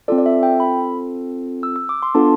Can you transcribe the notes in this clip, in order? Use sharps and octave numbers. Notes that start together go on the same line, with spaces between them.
C4 F4 A4 D5
D5
E5
G5
B5
E6
E6
D6
C6
B3 D4 F4 A4 A5